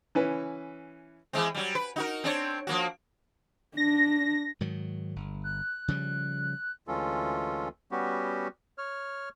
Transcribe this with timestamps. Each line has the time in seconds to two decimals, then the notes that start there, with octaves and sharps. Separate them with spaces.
0.15 E3 C#4 B4
1.33 E3 G#3 C4
1.55 F#3 G3
1.75 B4
1.96 D#4 F#4 A#4
2.24 C4 D4 C#5
2.67 F3 A#3 F#4
3.77 D4 A#6
4.61 G#2 D#3 F#3
5.16 G1
5.44 F#6
5.88 C#3 F3 G3
6.88 D2 E3 G#3 C#4 F4 A4
7.91 G3 B3 C#4 F#4 G4
8.78 C#5 F6